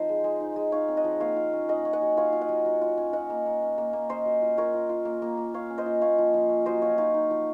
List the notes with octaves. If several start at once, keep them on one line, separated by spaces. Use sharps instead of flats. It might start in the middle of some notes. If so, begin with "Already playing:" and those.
Already playing: F3 C4 D#4 C5 D#5
G#3
G#3
D#4
G#3
D#4 C#5 F5
C4
D#5 F#5
F3
A#3 C#5 F5
F4
C#4
C#4 D#5 F#5
C#4
D#5 F#5
F#3
F4 C#5 F5
F4
D#5 F#5
F#3
F#3
F4
C#4
F4 D#5 F#5
A#3
A#3
C#4
A#3
A#3
C#4 C5 D#5
F#3
F4
F4 A#4 C#5
F4
F4
A#3
A#3
A#3
F4 C#5 F5
C#4
C5 D#5
F4
A#3 C#5 F5
F3
F3
C#4
F#3 C5 D#5
F#3 C#5 F5
D#4 C#5 F5
D#4
F3